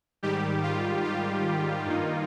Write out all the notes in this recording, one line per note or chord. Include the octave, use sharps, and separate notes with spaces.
G#2 D#3 G3 G4
F4
F4
G2 D#3 A#3 D#4